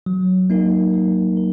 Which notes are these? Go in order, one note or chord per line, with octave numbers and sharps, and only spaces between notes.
F#3
A#3 D#4 A#4
F#3
A#4